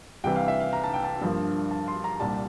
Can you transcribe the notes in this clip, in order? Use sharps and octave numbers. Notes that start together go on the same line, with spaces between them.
C2 C3 E3 G5
F5
E5
F5
A#5
A5
G5
A5
G2 F3 A#3
A5
C6
A#5
C2 A#2 G3 A5